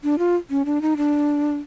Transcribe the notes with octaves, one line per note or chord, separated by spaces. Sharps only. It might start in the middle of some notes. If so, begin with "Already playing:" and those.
D4
F4
C#4
D4
D#4
D4